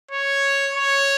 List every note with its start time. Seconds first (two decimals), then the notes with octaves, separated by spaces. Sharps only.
0.11 C#5
0.74 C#5